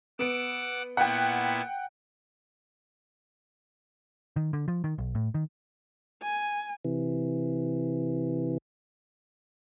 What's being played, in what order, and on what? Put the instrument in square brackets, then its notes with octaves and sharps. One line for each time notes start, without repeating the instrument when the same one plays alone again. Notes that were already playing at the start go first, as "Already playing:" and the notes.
[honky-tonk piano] B3 D7 [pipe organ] F#5 D6 E6
[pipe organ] A#2 B3 E4 [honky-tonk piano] F#5 G5
[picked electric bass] D#3
D3
F3
D#3
B1
A2
D#3
[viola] G#5
[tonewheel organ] C3 E3